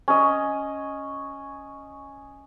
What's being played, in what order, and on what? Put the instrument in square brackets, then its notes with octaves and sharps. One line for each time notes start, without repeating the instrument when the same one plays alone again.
[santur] C#4 D#5